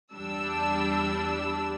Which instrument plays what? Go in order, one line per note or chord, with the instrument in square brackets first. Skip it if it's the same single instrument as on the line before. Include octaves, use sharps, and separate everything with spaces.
[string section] E2 G3 D4 E6